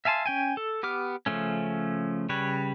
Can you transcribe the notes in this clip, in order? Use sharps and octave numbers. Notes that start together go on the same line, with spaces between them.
E5 F5 G#5 A5 C6
C#4 G5 G#5
A4
B3 G4 D6 F6
C#3 F3 A3 C#4
C#3 G3 B4 C#5